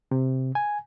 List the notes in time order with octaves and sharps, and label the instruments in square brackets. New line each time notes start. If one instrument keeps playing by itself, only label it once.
[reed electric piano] C3
G#5